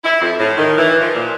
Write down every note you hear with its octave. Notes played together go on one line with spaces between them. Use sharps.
E4
F2
A2
D#3
E3
F3
A#2